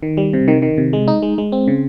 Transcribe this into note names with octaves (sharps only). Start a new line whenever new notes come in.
D#3
G3
C3
D#3
D#3
C3
G#3
D#4
G#3
G#3
C4
C#3